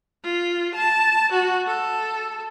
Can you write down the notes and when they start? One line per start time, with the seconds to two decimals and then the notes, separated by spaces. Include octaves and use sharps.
0.24 F4
0.75 A5
1.32 F#4
1.67 A4